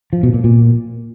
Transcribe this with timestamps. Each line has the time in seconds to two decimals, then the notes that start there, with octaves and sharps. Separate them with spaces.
0.13 F3
0.23 B2
0.34 A#2
0.44 A#2